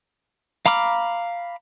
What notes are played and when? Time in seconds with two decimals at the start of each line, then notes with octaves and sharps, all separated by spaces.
0.66 F5 A#5 B5 D6 F6